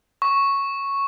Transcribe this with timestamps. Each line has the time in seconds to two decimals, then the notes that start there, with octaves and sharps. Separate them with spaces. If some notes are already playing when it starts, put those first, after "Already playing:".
0.22 C#6